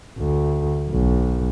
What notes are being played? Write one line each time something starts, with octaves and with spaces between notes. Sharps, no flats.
D2
B1